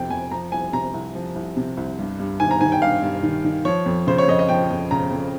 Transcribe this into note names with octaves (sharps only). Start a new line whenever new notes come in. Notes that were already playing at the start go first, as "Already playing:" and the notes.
Already playing: F2 C3 F3 G5
F2 G#5
F3 A#5
C2 G#5
C3 A#5
C2
F3
C2
C3
C2
G2
G2
D#3 G#5
A#5
D#3 G#5
G5
G2 F5
G2
D#3
D#3
F3 C#5
F2
C#3 C5
C#5
F2 D#5
D#5
F3 G5
F2
C#3 A#5
F2